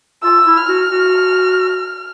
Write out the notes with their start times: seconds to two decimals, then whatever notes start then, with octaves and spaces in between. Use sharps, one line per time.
0.23 F4 E6
0.46 E4
0.57 F6
0.69 F#4
0.91 F#4